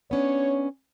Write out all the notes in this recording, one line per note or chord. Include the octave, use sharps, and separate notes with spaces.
B3 C#4 D4 C#5